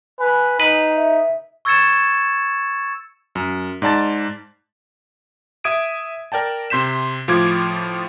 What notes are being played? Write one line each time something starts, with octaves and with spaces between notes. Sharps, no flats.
B4 G#5
D#4 B4
E5
C#6 E6 G#6 A6 C#7 E7
F#2
G#2 D5 A5 A6
E5 D#6 G#6 D7 D#7
A#4 D5 G5 A5
C3 C6 G6 B6 E7
A2 F3 F4 D6 G#6